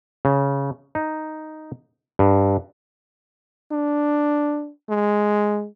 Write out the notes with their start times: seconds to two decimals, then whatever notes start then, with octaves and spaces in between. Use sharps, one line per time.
0.25 C#3
0.95 D#4
2.19 G2
3.72 D4
4.89 G#3